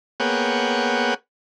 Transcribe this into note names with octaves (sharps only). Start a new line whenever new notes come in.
A#3 B3 G#4 C#5 F#5 G5